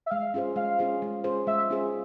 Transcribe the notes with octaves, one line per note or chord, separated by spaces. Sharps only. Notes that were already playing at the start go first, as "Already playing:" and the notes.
E5
G#3 F5
C#4 F4 G#4 C5
G#3 F5
C#4 F4 G#4 C5
G#3
C#4 F4 G#4 C5
G#3 E5
C#4 F4 G#4 C5